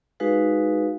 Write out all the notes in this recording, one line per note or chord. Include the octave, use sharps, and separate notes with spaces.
G#3 D#4 F#4 G#4 B4 F5